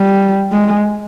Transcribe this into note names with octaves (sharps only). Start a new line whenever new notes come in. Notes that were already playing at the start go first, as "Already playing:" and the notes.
Already playing: G3
G#3